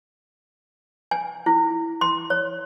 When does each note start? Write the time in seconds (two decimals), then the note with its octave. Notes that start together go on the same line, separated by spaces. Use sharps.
1.11 G#5
1.46 E4
2.01 C6
2.30 C#5